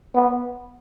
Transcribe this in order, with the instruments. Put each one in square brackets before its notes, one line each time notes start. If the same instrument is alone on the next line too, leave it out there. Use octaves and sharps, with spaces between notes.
[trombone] B3